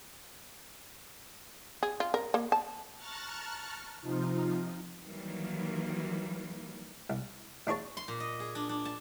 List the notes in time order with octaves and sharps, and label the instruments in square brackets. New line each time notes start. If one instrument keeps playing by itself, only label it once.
[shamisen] G#4
F4
A#4
A#3
A5
[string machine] A5 A#5 C#6 F6 F#6 A6
C3 F3 D#4 F4
[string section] D#3 E3 F#3 G3 A#3
[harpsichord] C2
A1 D4 G#4 C#5 A5
[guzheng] C6
A#2
D#5
G#4
D4
D4
A5